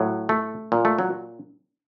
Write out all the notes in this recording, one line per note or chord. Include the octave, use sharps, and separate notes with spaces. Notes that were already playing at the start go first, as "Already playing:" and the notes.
Already playing: A2 F#3
A3
A#2
A3
F#3